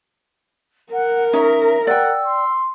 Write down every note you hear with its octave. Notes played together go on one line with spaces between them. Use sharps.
A#4 F#5
C#4 D#4 C#5 E5 A#5
D5 F#5 G5 E6
C6